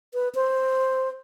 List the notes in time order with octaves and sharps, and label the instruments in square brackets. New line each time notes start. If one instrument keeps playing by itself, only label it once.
[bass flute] B4
C5